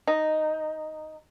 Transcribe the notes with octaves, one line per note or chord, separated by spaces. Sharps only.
D#4